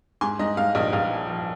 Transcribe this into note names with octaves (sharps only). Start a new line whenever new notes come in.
G#2 G#5 C6
G#2 D#5
G#2 F5
A#1 D#5
A#1 F5
F3
F3